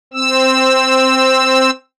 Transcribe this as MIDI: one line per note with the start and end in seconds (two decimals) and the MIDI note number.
0.13 1.70 60
0.13 1.70 88